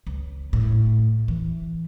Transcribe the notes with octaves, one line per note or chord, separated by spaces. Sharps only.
C#2
A2
E3